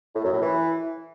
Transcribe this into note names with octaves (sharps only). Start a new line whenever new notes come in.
A2
F#2
A2
E3